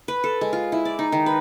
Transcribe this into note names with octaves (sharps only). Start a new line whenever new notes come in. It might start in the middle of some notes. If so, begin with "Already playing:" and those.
B4
A4
G#3
F4
E4
D5
D#4
D#3
B4